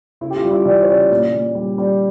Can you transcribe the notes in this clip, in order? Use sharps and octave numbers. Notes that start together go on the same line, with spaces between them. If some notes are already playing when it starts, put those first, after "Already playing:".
C#3 E4
G4
F4
G3
E4
E3 D5
C#5
C#3 D5
A#2
A#2
G3
G3